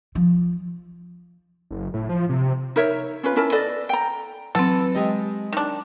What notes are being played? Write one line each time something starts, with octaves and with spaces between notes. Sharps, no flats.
F3
F#1
A2
F3
C3
D#4 A#4 C#5 E5
C#4 F4 B4
C#4 E4 A#4 A5
A4 B4 D5 D#5
G5 A#5
E3 F#3 C4 A4
G#3 G4 D#5
D#3 D4